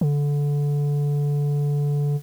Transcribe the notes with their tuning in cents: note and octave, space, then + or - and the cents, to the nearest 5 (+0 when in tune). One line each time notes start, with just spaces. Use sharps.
D3 -20